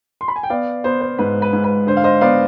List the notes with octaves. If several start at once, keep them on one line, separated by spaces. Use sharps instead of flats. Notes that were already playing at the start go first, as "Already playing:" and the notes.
C6
B5
G#5
G5
B3 D5 F5
B3 C5
C5
G#2 B4
B4
G#2
B4
D3 C5
F5
C5 D#5
B3 D5 F5